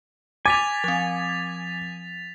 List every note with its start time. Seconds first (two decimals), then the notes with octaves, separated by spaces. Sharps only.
0.46 G#5 D6 A6 B6 F7
0.84 F3 C4